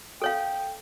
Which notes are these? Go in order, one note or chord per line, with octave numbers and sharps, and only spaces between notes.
A4 C#5 F5 G5